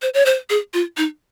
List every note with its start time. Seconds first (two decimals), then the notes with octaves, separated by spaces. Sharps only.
0.02 C5
0.14 C#5
0.26 C5
0.50 G#4
0.74 F4
0.97 D#4